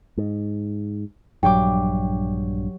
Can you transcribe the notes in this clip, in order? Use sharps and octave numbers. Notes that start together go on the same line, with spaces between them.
G#2
A#1 G2 F#3 G4 G5 D6